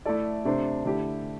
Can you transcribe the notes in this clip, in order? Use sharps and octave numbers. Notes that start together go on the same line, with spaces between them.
A3 E4 A4 D5
C3 A3 D4 C5
D3 A3 E4 G4